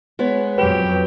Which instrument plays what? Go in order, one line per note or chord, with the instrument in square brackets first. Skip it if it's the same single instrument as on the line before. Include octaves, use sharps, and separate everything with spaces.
[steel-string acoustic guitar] G#3 B3 C#5
[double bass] F2 F#3 [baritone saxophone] G4 [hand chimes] B4